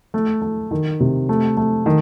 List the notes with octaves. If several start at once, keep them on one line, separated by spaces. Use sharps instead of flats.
A3
A3
D#3
C3
A3
A3
D#3